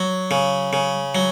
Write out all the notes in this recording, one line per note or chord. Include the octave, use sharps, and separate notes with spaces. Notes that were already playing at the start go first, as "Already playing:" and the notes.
Already playing: F#3
C#3
C#3
F#3